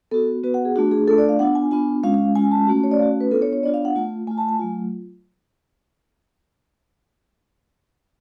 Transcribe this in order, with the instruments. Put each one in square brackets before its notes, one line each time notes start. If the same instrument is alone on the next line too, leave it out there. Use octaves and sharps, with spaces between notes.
[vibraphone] B3 F#4 A4
B3 F#4 B4
F#5
G#4
A3 D4 F4 F#4
G#4
A3 D4 F4 A4
D5
F5
B3 D4 F4 F#5
G#5
B3 D4 F4 G#5
G#3 C#4 F4 F5
F5
G#3 C#4 F4 G#5
A5
A3 C#4 F#4
C#5
D5
A3 C#4 F#4 F5
B4
B3 D4 F4 A4
C#5
C#5
B3 D4 F4 D5
F5
F#5
A3 F4
A3 G#5
F4
A5
G#5
F#3 A3 F4